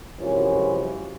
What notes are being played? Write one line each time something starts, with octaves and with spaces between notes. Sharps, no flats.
C#2 F#2 C3 E3 F3 C#4